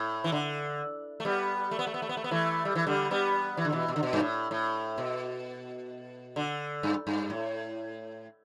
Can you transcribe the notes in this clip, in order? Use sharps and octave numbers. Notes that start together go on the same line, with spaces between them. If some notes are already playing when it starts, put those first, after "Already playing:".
Already playing: A2
E3
D3
A3
G3 B3
A3
B3
A3
B3
A3
B3
A3
B3
E3 A3
G3
E3
D3 G3
G3 B3
E3
D3
B2 E3
B2
D3
B2
G2
A2
A2
B2
D3
G2
G2
A2